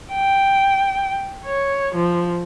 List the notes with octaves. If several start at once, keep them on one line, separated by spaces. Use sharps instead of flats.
G5
C#5
F3